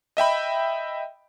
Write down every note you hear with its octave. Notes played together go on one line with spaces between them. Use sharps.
D#5 E5 G5 B5